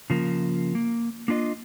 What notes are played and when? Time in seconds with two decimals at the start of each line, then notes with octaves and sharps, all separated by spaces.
0.10 C#3 F3 A#3
0.75 A#3
1.28 A#3 D4 F4 D#5